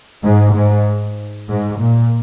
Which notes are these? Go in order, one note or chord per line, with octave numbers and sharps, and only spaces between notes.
G#2
G#2
G#2
A#2